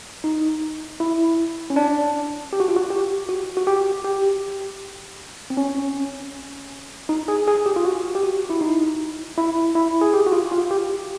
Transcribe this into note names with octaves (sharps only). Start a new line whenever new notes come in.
D#4
E4
C#4
D4
G4
F#4
F4
F#4
G4
F#4
F#4
G4
G4
C4
C#4
D#4
G#4
G#4
G4
F4
F#4
G4
F#4
E4
D#4
E4
E4
G#4
G4
F#4
F4
F4
G4